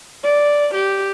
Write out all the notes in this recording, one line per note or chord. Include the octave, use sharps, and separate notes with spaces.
D5
G4